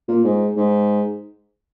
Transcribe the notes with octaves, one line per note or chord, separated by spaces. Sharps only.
A#2
G#2
G#2